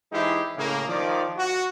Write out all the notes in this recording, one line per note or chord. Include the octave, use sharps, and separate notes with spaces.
E3 G#3 D#4 E4 G4 C5
A2 C#3 A#3
D#3 F3 D5
F#4